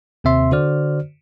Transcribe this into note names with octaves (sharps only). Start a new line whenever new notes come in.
D#2 C3 C4 E5 C6
D3 F#4 C5 D5 F6